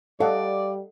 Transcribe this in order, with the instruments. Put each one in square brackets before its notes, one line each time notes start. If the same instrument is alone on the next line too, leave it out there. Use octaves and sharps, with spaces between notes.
[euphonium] G3 [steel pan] A4 D#5 F#5 [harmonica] D5 [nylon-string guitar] F5